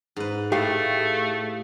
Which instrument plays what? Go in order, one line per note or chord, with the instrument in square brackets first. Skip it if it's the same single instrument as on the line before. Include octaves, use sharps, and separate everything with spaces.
[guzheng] G#2 B4
[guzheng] A2 [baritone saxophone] A3 [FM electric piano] G4 [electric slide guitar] G#4 F5